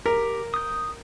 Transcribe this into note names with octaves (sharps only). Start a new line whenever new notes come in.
G4 A#4
D#6 G6